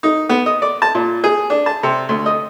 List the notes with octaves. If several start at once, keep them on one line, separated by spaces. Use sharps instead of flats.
D#4
B3
D#5
D5
A5
A#2
G#4
D4
A5
C3
D2
D#5